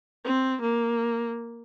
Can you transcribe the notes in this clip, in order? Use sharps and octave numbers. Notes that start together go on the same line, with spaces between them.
C4
A#3